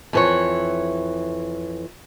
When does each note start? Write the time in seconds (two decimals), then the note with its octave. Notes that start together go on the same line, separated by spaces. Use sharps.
0.13 F2 E3 C#5